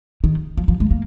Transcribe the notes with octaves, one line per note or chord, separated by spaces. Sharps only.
D#3
F3
F3
G#3
A#3